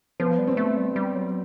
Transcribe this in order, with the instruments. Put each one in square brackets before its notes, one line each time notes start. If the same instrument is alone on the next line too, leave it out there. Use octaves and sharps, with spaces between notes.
[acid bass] F3 [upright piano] B3
[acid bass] G3
[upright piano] C4
[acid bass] A3
G3
G3
F#3